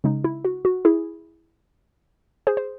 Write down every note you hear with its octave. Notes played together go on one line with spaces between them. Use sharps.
C#3 G#3 D#4
E4
F#4
F#4
E4 G#4
G#4 C5
C5